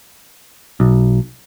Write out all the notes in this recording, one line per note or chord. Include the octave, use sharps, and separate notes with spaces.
B1